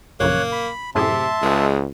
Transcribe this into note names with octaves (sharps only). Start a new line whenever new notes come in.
A#1 F#2 C#3 A#3 C#5 F#6
B5
F#2 A2 C3 G#4 E5 A5 C6
C#2 G#3